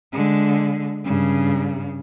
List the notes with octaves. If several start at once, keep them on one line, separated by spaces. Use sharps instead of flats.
D3 G#3
G2 C#3